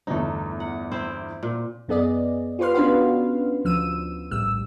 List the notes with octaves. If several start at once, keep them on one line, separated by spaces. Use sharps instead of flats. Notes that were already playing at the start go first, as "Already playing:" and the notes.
G1 E2 A3 D#4
F#5
C4 E4 C5
A#2
F#2 B3 G#4 D5 D#5
F4 G4 B4 C6 F6
B3 C#4 D4 F#4 B4 F5
D2 F3 E6 D#7
A#1 A2 G3 E6